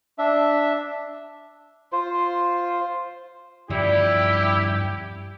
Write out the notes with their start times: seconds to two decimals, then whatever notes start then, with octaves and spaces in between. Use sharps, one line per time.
0.18 D4 E5
1.92 F4 C5
3.70 G2 F3 G3 E4 G4